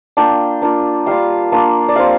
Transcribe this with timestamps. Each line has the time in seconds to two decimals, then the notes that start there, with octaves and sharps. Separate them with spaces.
0.17 A#3 D4 F4 G5
0.62 A#3 D4 F4
1.06 G3 D4 F4 F5
1.52 A#3 D4 F4
1.89 D5
1.96 G3 C4 F4 F5